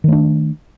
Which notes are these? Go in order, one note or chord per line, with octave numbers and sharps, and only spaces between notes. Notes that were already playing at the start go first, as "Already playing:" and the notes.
D#3 A3 D4